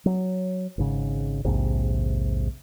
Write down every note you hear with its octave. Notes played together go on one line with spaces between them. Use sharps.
F#3
G#1 G#2 C#3
A#1 D#2 G#2 C3